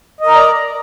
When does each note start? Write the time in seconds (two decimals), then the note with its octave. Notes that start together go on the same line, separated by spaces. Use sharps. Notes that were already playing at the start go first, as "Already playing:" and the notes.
0.21 D#5
0.26 A#4
0.31 A#5
0.36 D5